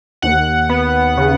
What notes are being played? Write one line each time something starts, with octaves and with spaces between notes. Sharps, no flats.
D#2 F#5
B3
C#3